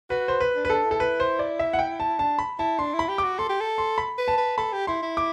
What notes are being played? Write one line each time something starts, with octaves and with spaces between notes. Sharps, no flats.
F#4 B4
C5
B4
D4
B4
D4 A4
E4
A4
B4
C5
D5
E5
F#5
G5
A5
D4 A5
B5
E4 A5
D4 C6
E4
B5
G4
D6
F#4
A4 C6
G4
A4
C6
B5
B4
A5
B4
A4 B5
G4
E4 C6
E4
D6